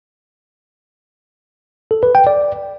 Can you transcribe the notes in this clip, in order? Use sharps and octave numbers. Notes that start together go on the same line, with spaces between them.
A4
B4
G5
D5